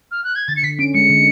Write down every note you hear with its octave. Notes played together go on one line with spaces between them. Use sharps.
F6
F#6
G#6
D3 A6
C#7
D3 B6
C#4 D7
G#3 C#7
D3